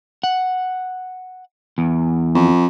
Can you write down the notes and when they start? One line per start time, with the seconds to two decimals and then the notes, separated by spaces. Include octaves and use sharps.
0.23 F#5
1.78 E2
2.35 F2